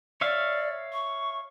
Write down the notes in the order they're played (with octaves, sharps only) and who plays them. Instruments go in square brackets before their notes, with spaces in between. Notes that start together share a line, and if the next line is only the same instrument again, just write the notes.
[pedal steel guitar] C#5 E5 F5 [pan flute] D5
[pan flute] C#6